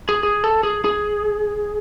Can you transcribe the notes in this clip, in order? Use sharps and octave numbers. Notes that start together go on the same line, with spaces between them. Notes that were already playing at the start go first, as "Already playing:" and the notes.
G#4
G#4
A4
G#4
G#4